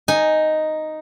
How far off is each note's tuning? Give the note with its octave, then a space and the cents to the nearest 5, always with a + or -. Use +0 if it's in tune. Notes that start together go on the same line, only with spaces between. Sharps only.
D#4 +0 G#5 +0